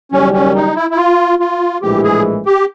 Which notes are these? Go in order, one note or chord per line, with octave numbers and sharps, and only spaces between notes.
F#1 F#2 D#3 G3 C#4
C#4
D#4
E4
E4
F4
F4
A#1 A2 E3 G#3 G4
G#4
G4